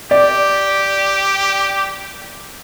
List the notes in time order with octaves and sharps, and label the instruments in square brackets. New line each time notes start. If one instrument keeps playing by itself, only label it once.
[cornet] G4 [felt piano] D5